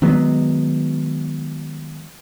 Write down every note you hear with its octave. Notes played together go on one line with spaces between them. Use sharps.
D#3 F#3 G#3 B3